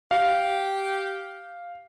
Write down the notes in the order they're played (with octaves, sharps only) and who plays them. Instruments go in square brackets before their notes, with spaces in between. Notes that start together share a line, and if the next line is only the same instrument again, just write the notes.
[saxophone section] G4 [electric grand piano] F5